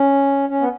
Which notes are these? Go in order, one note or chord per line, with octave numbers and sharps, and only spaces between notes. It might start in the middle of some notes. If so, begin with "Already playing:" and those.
Already playing: C#4
C#4
B3